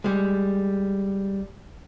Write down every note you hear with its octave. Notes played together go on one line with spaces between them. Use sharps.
G3 G#3